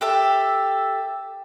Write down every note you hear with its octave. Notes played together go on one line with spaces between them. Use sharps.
G4 A4 E5